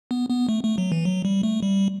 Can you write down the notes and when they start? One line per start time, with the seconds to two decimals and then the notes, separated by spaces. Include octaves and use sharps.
0.11 B3
0.30 B3
0.49 A3
0.64 A3
0.78 F#3
0.92 E3
1.05 F#3
1.25 G3
1.43 A3
1.63 G3